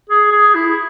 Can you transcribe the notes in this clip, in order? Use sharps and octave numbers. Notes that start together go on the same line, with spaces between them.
G#4
G#4
E4